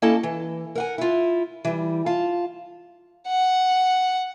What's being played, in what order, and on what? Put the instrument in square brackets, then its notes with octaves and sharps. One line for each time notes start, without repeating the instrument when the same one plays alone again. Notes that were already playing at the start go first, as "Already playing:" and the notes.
[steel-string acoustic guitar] A#3 C#4 E4 A4 D#5 A5
E3
A#4 F#5 G#5
E4 F4
E3 G3
F4 F5 A5
[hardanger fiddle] F#5